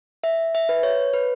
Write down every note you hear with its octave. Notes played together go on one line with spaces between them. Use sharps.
E5
E5
B4
C#5
B4